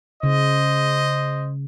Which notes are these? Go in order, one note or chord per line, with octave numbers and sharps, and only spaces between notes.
C#3 C5 D#5